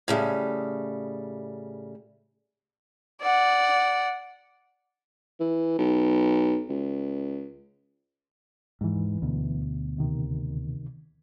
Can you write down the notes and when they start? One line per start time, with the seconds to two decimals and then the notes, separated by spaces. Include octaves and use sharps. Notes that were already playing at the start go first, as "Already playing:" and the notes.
0.08 A2 C#3 G3
3.22 D5 F#5
5.40 E3
5.79 B1
6.69 C#2
8.81 D#2 G#2 E3
9.22 D2 B2
9.97 C#2 C3 D#3